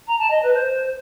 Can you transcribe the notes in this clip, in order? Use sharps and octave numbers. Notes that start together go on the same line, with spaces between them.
A#5
A5
D#5
B4
C5